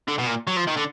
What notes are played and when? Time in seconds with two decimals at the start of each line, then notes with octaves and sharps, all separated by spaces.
0.08 D3
0.18 B2
0.27 A#2
0.47 F#3
0.57 F3
0.67 D#3
0.76 D3